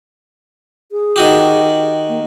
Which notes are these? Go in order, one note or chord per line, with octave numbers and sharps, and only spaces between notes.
G#4
D#3 F#4 G4
A#3